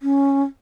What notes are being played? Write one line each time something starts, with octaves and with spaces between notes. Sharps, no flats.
C#4